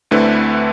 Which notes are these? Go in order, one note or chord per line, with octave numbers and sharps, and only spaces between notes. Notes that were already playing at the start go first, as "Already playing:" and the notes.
D2 D3 A3 C4 E4 B4